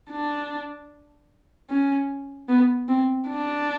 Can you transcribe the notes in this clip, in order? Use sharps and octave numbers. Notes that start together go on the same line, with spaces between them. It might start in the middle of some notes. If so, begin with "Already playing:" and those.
D4
C#4
B3
C4
D4